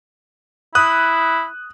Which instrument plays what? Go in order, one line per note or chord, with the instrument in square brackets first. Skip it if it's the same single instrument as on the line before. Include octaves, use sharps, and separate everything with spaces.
[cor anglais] E4 [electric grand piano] D#6 F#6